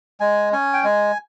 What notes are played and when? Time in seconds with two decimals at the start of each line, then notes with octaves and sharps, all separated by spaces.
0.20 G#3 G#5
0.53 C#4 G#5
0.74 G5
0.84 G#3 G#5